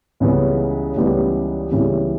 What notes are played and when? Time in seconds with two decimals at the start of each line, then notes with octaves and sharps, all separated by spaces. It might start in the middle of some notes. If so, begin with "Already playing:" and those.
0.20 C#2 C#3 E3 G3 B3
0.96 C#2 C#3 E3 G3 B3
1.71 C#2 C#3 E3 G3 B3